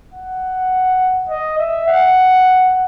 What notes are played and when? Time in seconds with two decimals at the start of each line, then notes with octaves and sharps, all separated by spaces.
0.14 F#5
1.29 D#5
1.59 E5
1.88 F#5